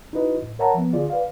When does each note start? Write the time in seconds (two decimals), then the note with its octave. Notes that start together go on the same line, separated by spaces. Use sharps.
0.13 D#4 E4 F#4 B4 D#5
0.42 A2
0.59 A#4 C#5 E5 F#5 A5 A#5
0.74 F3 B3
0.93 D3 F4 G#4 D5
1.10 B4 D5 F5